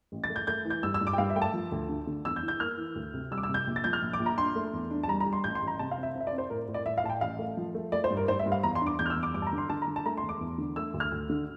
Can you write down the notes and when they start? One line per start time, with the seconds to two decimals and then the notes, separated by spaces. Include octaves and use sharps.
0.12 A1
0.24 A6
0.30 A3
0.36 G6
0.47 A3 G6
0.65 E3
0.70 G6
0.83 G2 E6
0.94 E6
1.01 G2
1.07 D6
1.13 G5
1.18 G2 F5
1.30 E5
1.36 A3 G5
1.42 A5
1.54 F3
1.72 D2
1.89 D3
2.07 D3
2.25 E2 E6
2.36 G6
2.43 E3
2.48 G6
2.60 A#3 F6
2.77 E3
2.95 D2
3.14 C3
3.31 G3 E6
3.38 D6
3.43 E6
3.49 C3
3.54 G6
3.67 A#1
3.76 A6
3.84 F3 G6
3.93 F6
4.02 A#1
4.13 D6
4.20 A#1
4.26 A#5
4.38 D4 C6
4.55 A3
4.73 E2
4.91 D4
5.03 A5
5.08 G3 A#5
5.20 A#5
5.26 G3
5.33 C6
5.44 A1 G6
5.55 C6
5.62 A1
5.67 A#5
5.79 C3 A5
5.91 F5
5.98 C4
6.03 E5
6.15 C4
6.20 E5
6.27 D5
6.33 C4
6.38 C5
6.50 A2 A#4
6.68 A2
6.74 D5
6.86 A2 E5
6.98 F5
7.04 A2 A5
7.10 G5
7.21 A1 F5
7.39 A3
7.57 F3
7.75 A3
7.92 A3 D5
8.04 C5
8.10 G2
8.17 A#4
8.28 G2 C5
8.39 E5
8.46 G2
8.52 F5
8.63 E2 A#5
8.75 C6
8.81 D4
8.87 D6
8.99 E2 G6
9.06 F6
9.10 E6
9.16 E2
9.23 D6
9.34 G2 D6
9.42 A5
9.47 A#5
9.53 D3
9.58 C6
9.70 D3 A5
9.82 A#5
9.88 D3
9.96 A5
10.06 A3 A#5
10.17 C6
10.23 E1
10.29 D6
10.41 E2
10.58 D3
10.76 A3 E6
10.94 D2
11.00 F6
11.12 D2
11.30 D3